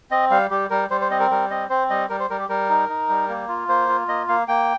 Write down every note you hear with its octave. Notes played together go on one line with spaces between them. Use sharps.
C4 D#5
G3 F5
G3 G4
G3 A#4
G3 C5
C5
C4 D#5
A#4
G3 A#4
C4 D#5
C4 C5
G3 D#5
G3 A#4
C5
G3 A#4
G4
G3 A#4
D#4
D#4
G3
A#3
F4
A#3 C5
F4
A#3 D#5
A#3 F5
A#3 G5